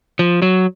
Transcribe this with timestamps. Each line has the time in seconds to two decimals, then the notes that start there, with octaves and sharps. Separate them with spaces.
0.19 F3
0.42 F#3